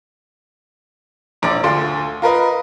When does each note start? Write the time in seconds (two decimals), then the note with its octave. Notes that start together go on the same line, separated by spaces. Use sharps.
1.42 E1 A#1 D5 D6 D7
1.64 D2 F4 A4 C6
2.22 F4 A#4 B4 D#5